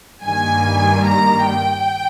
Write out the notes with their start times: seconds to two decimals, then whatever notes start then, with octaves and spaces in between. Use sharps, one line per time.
0.24 G2 D#3 G3 A#3 G#5
1.06 A#5
1.46 G5